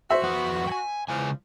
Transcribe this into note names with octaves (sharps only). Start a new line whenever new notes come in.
F#4 C5 E5
F2 B4 F#5
G5 G#5
E2 C#3 E3 F3 G#3 G#5